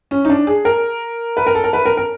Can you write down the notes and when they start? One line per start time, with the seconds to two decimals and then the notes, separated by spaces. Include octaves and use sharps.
0.11 C#4
0.25 D#4
0.30 D4
0.47 G#4
0.65 A#4
1.37 B4
1.47 A#4
1.55 A4
1.64 A#4
1.73 B4
1.85 A#4
1.97 A#4